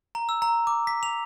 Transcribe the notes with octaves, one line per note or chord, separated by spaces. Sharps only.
A#5
E6
A#5
D6
B6
F7